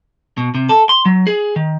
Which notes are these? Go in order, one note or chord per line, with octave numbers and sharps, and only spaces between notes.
B2
C3
A4
C6
F#3
G#4
D#3